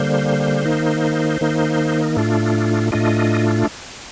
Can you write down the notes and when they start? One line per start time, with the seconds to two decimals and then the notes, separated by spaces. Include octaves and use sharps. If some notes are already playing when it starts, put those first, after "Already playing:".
Already playing: D3 G3 A#3 C5
0.65 D#3 A#3 D#4
1.41 D#3 A#3 D#4
2.16 A2 A3 D4 F4
2.92 A2 A3 D4 F4 D#5